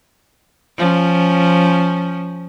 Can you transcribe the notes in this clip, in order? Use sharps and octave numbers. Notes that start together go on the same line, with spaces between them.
F3 C#4